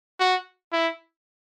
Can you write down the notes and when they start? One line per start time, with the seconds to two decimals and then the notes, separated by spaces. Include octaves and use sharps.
0.20 F#4
0.72 E4